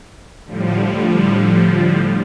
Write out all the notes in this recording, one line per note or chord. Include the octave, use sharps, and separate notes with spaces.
A2 D3 F3 G3